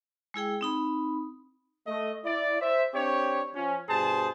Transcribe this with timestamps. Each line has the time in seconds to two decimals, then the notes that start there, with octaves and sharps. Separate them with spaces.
0.34 G#3 E4 G#4 G5
0.61 C4 D#4 B5
1.87 A3 D#5
2.25 E4 D5
2.61 C5 E5
2.94 C4 D4 G4 C#5
3.55 F3 C#4
3.89 G2 B2 G#4 C5 A5